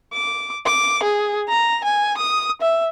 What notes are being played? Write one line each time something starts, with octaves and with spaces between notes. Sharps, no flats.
D6
D6
G#4
A#5
G#5
D#6
E5